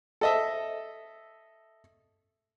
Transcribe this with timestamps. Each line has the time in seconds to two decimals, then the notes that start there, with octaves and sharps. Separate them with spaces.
0.21 A4 D#5 E5